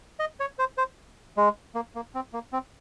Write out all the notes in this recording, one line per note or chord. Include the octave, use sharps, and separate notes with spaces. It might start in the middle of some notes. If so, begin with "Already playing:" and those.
D#5
C#5
C5
C5
G#3
A#3
A#3
C4
A#3
C4